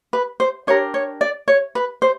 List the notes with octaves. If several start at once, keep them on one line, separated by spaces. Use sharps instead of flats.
B4
C5
D4 G4 A#4 C#5
C#5
D5
C#5
B4
C5